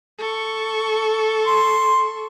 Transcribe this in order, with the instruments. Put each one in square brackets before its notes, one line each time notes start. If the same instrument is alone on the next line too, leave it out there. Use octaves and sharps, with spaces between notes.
[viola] A4 C#6
[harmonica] C6